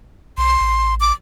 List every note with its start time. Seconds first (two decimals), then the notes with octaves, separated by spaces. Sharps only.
0.38 B1 C6
0.61 A1
1.00 D6